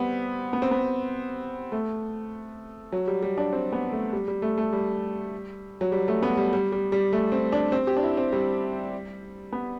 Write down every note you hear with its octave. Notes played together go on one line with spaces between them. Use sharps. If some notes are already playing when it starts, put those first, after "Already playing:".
Already playing: G3 B3 C4
B3
C4
B3
A3
F#3
G3
G3
D4
C4
B3
A3
G3
G3
A3
A3
G3
F#3
G3
A3
B3
G3
G3
G3
G3
A3
C4
D4
C4
G4
D4
E4
C4
G3
B3